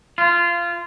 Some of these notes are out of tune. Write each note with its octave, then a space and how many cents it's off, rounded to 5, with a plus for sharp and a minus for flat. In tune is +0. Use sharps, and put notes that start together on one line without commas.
F4 -20